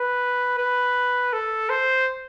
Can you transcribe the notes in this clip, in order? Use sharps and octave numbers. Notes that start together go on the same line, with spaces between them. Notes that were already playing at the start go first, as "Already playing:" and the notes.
Already playing: B4
B4
A4
C5